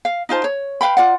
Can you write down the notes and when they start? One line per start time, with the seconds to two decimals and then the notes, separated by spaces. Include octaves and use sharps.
0.05 F5
0.29 D#4 F4 C5 A5
0.44 C#5
0.81 B4 F5 G5 B5
0.97 F4 D5 F#5